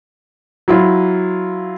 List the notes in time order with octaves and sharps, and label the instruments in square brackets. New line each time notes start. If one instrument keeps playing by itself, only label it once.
[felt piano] F#3 E4 F4